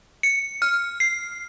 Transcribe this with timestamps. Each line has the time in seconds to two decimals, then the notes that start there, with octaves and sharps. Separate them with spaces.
0.23 C#7
0.62 F6
1.00 C7